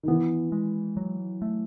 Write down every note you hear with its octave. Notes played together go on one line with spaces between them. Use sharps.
D#3
E3 B3
G#3
F#3
A3